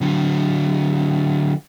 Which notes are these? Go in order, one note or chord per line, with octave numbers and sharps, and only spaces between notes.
D3 F#3